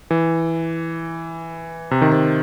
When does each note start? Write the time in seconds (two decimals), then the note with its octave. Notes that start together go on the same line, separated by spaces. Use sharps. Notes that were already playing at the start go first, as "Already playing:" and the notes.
0.11 E3
1.91 C3
2.02 D#3
2.12 C3